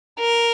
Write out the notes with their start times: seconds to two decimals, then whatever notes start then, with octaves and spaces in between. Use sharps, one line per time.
0.19 A#4